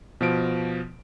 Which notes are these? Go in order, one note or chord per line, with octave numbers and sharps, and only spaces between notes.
B2 F3 D7